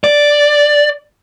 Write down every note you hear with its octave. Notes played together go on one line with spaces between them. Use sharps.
D5